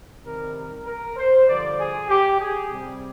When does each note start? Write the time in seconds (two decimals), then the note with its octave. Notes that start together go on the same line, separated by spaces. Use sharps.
0.24 C3 D#3 G3 A#4
0.55 A#4
0.86 A#4
1.16 C5
1.47 G2 D3 F3 D5
1.78 G#4
2.09 G4
2.40 G#4
2.70 C3 G3